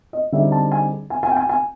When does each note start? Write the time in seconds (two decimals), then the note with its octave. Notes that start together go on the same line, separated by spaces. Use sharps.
0.13 D#5
0.32 D3 G3 C4 D#4 G#4 E5
0.52 A5
0.72 G#5
1.10 G#5
1.23 G#5
1.31 G5
1.36 G#5
1.49 G#5